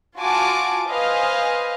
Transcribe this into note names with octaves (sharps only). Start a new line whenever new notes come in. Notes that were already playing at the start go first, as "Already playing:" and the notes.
F4 F#4 G#5 A5 D6
B4 C5 D#5 F5 G#5